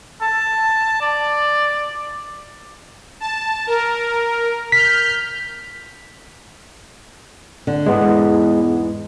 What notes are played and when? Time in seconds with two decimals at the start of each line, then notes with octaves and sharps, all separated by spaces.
0.22 A5
1.01 D5
3.20 A5
3.67 A#4
4.72 F6 G6 B6
7.67 D3
7.86 E2 G#2 G#3 B3